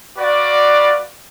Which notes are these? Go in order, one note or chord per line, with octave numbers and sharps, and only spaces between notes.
F#4 B4 D5 F5